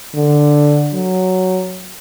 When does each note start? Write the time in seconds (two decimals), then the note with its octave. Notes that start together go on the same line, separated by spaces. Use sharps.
0.15 D3
0.93 F#3